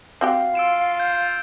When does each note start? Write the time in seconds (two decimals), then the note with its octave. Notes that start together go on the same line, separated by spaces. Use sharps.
0.21 C4 F#4 G4 F5
0.55 F4 E6 D7 E7
1.00 G6